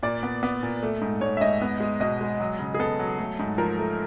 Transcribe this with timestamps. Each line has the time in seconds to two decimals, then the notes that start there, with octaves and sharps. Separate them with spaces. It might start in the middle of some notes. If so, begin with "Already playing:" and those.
0.03 A#2 D5
0.23 B3
0.43 B3
0.63 A#2
0.83 A3
1.01 G#2
1.21 G#2 C#5
1.37 E5
1.41 G#2 D#5
1.62 B3
1.80 G#3
2.00 B2 D#5
2.21 G#3
2.40 F#3
2.59 C#3
2.74 G#4
2.80 B3 A4
2.99 F#3
3.18 A3
3.39 G#2
3.58 F3 A#4
3.78 A3